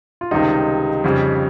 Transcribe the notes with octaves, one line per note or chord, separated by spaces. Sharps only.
F4
C#2 C3 D#3 G3 D#4
F2 C#3 G3